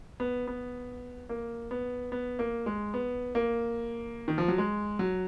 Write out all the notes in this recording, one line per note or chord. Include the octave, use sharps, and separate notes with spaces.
B3
B3
A#3
B3
B3
A#3
G#3
B3
A#3
D#3
F3
F#3
G#3
F#3